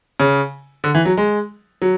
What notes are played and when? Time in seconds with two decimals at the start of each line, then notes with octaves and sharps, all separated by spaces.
0.20 C#3
0.84 D3
0.95 E3
1.05 F#3
1.17 G#3
1.82 F#3